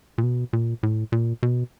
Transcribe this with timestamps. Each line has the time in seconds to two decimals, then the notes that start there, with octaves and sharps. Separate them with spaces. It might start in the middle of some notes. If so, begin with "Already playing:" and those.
0.18 A#2
0.23 B2
0.53 A#2
0.83 A2
1.12 A#2
1.43 B2